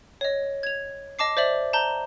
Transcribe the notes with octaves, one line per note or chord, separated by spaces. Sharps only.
C#5 D#5
G#6 F7
D#5 A5 D6 C7
C5 D5 E5 F#7
A5 A#5 G6 G7